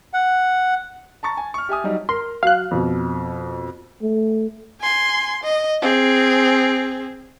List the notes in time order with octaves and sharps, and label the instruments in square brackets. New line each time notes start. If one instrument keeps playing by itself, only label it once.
[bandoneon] F#5
[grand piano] A5 A#5 C#6 A6
G#5
C#6 F6
G4 E5 G#5 D#6
F#3 G3 D#4
[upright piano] A#4 [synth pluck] C6
[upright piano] F#3 F6 [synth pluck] F5 F#6
[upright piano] F2 B2
[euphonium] A3
[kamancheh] G#5 C6
D#5
C4 G#4